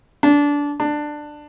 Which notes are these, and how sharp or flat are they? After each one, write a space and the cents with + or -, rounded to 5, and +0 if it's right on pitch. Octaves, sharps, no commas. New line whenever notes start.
D4 -20
D4 +15